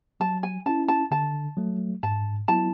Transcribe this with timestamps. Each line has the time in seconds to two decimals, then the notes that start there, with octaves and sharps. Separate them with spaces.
0.20 F#3 A5
0.43 G#5
0.66 C#4 E4 A5
0.88 A5
1.11 D3 A5
1.57 F#3 A3
2.03 G#2 A5
2.48 F#3 B3 E4 A5